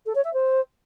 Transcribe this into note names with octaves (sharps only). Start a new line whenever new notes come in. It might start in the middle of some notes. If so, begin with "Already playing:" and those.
A4
C#5
E5
C5